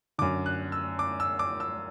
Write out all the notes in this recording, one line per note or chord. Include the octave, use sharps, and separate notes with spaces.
F#2 D3 D6
F#6
E6
D6
E6
D6
E6